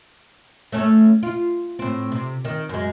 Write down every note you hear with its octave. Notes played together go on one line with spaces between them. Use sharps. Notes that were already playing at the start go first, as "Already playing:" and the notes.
A3 C#4 A4
F4
A2 C4
C3
D#3
F#2 G#3